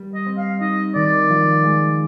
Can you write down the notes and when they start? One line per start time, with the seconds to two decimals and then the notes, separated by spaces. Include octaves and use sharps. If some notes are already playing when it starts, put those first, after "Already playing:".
Already playing: G3
0.15 D#5
0.26 C4
0.38 F5
0.60 D#4 D#5
0.95 D#3 D5
1.30 F3
1.64 G#3